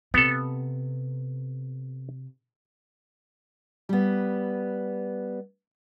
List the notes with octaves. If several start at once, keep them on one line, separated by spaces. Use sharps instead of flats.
C3 B3 A4
G3 B3